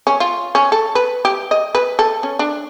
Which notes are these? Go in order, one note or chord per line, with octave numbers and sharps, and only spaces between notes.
C#4
F4
C#4
A4
B4
G4
D#5
B4
A4
C#4
D4